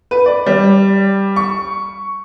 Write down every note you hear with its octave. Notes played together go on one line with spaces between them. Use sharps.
B4
D5
G3
C#6